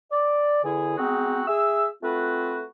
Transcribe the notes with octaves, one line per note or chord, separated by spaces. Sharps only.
D5
E2 D3 E4 G#4 G#5
G#3 B3 C4 D#4 F#4
G#4 E5 E6
A3 C4 F4 F#4 B4